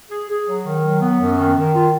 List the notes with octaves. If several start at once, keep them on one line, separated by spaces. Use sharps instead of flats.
G#4
G#4
F#3
D#3
F#3
B3
F#2
D#3
D#3
F4